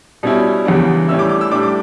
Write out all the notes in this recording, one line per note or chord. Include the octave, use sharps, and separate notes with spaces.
B2 G3 C#4 E4
E2 C#3 G3 B3 D4
A2 G3 C#4 E4 E6
D6
D6
E6
A2 G3 D4 D6
D6